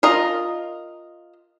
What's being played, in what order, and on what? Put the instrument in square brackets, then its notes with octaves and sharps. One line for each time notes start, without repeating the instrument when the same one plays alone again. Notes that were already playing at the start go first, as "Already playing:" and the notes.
[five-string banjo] F4 A#4 D#5